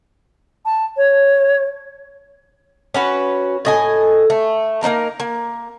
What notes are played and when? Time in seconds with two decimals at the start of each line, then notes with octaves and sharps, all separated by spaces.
0.66 A5
0.97 C#5
2.94 C#4 F#4 B4
3.65 A2 D#5 G#5
4.30 A3
4.83 A#3 C4 D#4 A#4
5.20 A#3